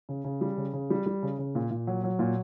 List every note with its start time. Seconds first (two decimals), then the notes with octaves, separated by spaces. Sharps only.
0.09 C#3
0.25 C#3
0.41 G3
0.57 C#3
0.73 C#3
0.90 G3
1.06 G3
1.23 C#3
1.39 C#3
1.55 A#2
1.71 A#2
1.87 F#3
2.03 F#3
2.19 A#2